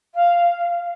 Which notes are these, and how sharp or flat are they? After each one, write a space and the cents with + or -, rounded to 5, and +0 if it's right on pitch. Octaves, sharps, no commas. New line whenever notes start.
F5 -5